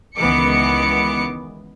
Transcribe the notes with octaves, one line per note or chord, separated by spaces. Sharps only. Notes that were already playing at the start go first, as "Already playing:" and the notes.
C#2 D#3 E3 B3 D6 C#7